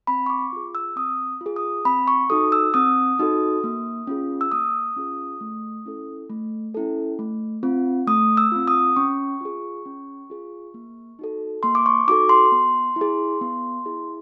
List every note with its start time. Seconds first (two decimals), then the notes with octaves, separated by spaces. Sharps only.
0.07 C4 B5
0.26 C#6
0.30 D6
0.53 F4 G#4
0.75 E6
0.96 C4 D#6
1.41 F4
1.46 G#4
1.56 D#6
1.85 C4 B5
2.08 C#6
2.30 D#4 F#4 A4 D#6
2.52 E6
2.74 C4 D#6
3.19 D#4 F#4 A4
3.64 A#3
4.07 C#4 F4 G#4
4.41 E6
4.52 A#3 D#6
4.96 C#4 F4 G#4
5.41 A3
5.86 C#4 E4 A4
6.30 A3
6.75 C#4 E4 A4
7.19 A3
7.63 C4 F4
8.07 A3 D#6
8.37 E6
8.52 C4 F4
8.68 D#6
8.96 C#4 C#6
9.41 F4 G#4
9.86 C#4
10.30 F4 G#4
10.74 A#3
11.19 D#4 F#4 A4
11.63 A#3 C6
11.75 D6
11.86 C#6
12.07 D#4 F#4 A4 D6
12.29 C6
12.52 B3
12.96 E4
13.01 G#4
13.41 B3
13.86 E4 G#4